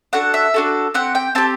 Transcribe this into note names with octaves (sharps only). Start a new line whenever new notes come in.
D4 F#4 A4 F#5
E5
D4 F#4 A4
C4 G4 F#5
G5
C4 G4 A5